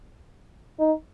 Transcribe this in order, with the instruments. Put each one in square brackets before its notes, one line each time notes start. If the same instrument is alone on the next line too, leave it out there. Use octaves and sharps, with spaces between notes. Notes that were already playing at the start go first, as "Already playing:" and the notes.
[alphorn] D#4